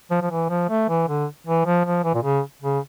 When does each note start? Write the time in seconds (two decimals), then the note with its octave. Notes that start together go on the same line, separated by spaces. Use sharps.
0.11 F3
0.22 F3
0.31 E3
0.50 F3
0.69 A3
0.89 E3
1.08 D3
1.47 E3
1.65 F3
1.85 F3
2.04 E3
2.15 A#2
2.23 C#3
2.62 C#3